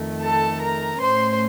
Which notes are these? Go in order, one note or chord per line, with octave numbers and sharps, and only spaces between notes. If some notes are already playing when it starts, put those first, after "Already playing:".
Already playing: F2 D#3 A3
A4 A5
A#4 A#5
A2 A3 C#4 C5 C6